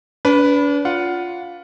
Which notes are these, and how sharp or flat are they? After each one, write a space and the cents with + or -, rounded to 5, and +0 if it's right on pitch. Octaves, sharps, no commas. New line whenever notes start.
D4 -40 B4 +0
F4 +5 F#5 +0